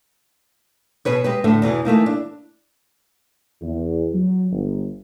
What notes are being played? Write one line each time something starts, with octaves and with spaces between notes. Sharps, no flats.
B2 G#4 B4 C#5
G#3 G4 B4
A2 D3 A3
E2 B2 E3
E3 A3 A#3 D#4
D4
E2
F#3
G1